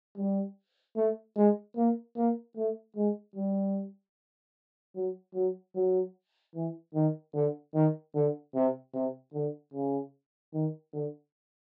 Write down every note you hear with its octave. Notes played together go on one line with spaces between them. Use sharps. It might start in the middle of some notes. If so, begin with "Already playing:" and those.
G3
A3
G#3
A#3
A#3
A3
G#3
G3
F#3
F#3
F#3
E3
D#3
D3
D#3
D3
C3
C3
D3
C#3
D#3
D3